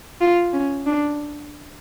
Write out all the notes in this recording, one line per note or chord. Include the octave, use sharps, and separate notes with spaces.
F4
C#4
D4